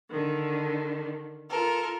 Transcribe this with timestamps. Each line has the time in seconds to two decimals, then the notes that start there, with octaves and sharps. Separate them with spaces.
0.10 D3 D#3
1.49 F4 A4 A#4